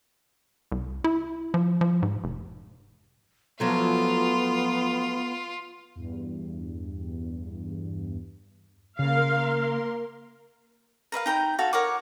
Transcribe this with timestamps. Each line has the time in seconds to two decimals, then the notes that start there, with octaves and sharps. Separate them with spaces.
0.72 C2
1.04 E4
1.54 F3
1.81 F3
2.02 G#2
2.24 F1
3.60 F3 F#3 A3 B3 F4
5.95 E2 G2
8.99 C#3 A#3 A#4 F5 C6
11.12 A#4 B4 E5 F5
11.26 D#4 G5 A#5 B5
11.59 F#4 A4 E5 F5
11.73 A#4 C#5 F#5 D6